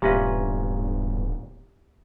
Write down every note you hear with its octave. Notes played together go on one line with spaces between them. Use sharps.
D1 E2 G2 A#2 C#4 G4 B4 E5